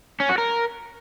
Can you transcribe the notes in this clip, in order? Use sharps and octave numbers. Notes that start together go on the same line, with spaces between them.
C#4
F#4
A#4